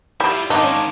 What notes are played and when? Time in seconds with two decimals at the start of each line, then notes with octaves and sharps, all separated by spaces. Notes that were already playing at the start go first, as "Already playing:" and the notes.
0.20 G3 E4 F4
0.50 G#2 D#3 D4 D#4 F5 C6 D6
0.63 C#4